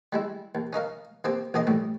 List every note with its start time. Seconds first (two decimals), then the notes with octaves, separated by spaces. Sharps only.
0.13 G3 G#3 E4
0.55 D#2
0.73 C#4 D#4 A#4 F5
1.24 D#2 A#3 C4 G4
1.54 A#1 D#3 G#4 D#5 C6
1.67 A1 A2 G3